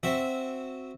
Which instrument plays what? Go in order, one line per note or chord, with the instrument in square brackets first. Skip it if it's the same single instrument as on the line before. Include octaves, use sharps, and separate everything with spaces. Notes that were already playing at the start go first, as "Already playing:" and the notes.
[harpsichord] C4 F#4 E5